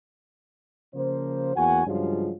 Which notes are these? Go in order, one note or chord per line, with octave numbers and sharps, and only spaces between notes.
C#3 F3 A#3 C5
E2 A#3 F#4 F#5 G#5
G2 C#3 F3 F#3 G#3 F4